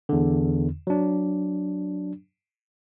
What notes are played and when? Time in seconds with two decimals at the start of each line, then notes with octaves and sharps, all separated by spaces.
0.09 E2 D3
0.87 F#3 D4